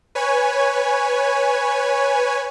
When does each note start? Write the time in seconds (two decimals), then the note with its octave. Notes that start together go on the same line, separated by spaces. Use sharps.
0.15 B4 C#5 G#5